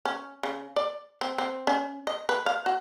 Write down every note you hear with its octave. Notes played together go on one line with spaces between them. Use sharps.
C#4
C#3
D5
C4
C4
C#4
D#5
B4
F5
F#4